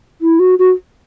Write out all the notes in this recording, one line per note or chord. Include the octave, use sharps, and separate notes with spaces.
E4
F#4
F#4